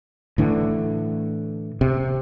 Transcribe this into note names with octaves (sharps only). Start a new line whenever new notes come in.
A2 D3 E3
C3